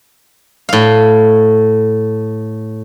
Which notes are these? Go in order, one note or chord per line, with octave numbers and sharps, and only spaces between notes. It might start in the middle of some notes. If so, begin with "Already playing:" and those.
A2 F5